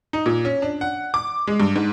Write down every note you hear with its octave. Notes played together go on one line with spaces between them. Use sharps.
D#4
A#2
C#4
D4
F#5
D6
G#3
G2
G#2